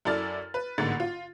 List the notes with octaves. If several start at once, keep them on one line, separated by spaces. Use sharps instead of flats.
F#2 E4 A4 D5 F6 A6
B4
A1 G#2 D3 A#3 A6
F4